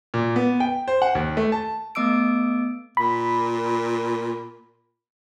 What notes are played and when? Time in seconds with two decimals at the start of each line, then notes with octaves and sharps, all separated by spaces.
0.14 A#2
0.36 B3
0.60 G5
0.88 C5
1.02 F#5
1.15 D#2
1.37 A3
1.52 A5
1.95 A3 B3 D#5 D6 E6 D7
2.97 A#2 B5